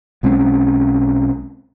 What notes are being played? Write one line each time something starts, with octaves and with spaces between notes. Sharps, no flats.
B1 G#3 C4 C#4